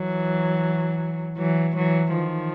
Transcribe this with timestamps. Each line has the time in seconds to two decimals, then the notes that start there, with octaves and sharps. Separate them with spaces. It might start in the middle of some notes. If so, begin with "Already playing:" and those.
Already playing: E3 F#3
1.37 E3 F#3
1.76 E3 F#3
2.14 D#3 F3